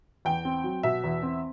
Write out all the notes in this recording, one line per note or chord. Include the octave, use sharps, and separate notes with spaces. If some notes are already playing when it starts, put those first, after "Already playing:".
E2 G5
C4
F#3
B2 E5
E2
C4